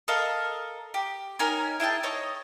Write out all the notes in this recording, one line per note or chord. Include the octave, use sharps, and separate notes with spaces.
A4 A#4 D#5 F5
G4
C#4 D#4 A#4 G#5
E4 G#4 G5 A5
D#4 C#5 D#5